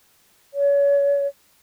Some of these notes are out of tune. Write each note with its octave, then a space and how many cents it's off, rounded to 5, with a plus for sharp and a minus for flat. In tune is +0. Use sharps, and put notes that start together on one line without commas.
C#5 +30